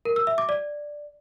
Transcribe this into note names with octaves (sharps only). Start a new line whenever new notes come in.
A#4
E6
E5
D6
D5